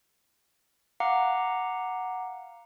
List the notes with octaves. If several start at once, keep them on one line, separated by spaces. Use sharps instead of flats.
F5 F#5 A#5 D6